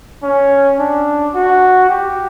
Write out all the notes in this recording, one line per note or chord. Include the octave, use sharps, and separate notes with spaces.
C#4
D4
F#4
G4